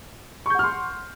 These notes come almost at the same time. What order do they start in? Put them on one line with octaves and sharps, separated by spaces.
C#6 G6 F#5 F6 C6